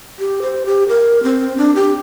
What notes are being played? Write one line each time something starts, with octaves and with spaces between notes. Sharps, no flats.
G4
C5
G4
A#4
C4
D4
G4